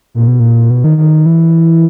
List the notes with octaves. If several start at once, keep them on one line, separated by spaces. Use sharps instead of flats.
A#2
B2
A#2
B2
D#3
D#3
E3